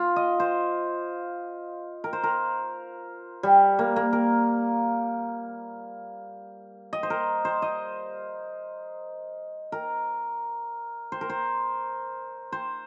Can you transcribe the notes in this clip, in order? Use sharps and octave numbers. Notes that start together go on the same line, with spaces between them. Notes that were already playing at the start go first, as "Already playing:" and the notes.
Already playing: F4
D#5
C5
A#4
C5
A#4
G3
A#3
A#3
A#4
D#5
C5
A#4
C5
D#5
A#4
C5
A#4
C5
C5